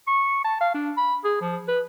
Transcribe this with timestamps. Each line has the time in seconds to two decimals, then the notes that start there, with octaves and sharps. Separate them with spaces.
0.07 C#6
0.45 A5
0.61 F5
0.75 D4
0.97 B5
1.24 G#4
1.41 F3
1.68 B4